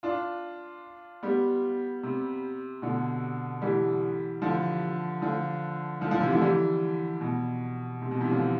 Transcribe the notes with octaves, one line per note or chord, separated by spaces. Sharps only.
D4 F4
G3 B3
C3
B2 D3
E3 G3
D3 F3
D3 F3
D3 F3
D3 F3
C3 E3
D3 F3
E3 G3
B2
C3
B2
C3 E3
D3 F3